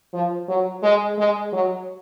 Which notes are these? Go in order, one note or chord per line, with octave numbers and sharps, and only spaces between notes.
F3
F#3
G#3
G#3
F#3